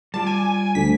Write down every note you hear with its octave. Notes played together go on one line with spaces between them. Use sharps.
G3 F4 G4 A5
G#5
D2 B6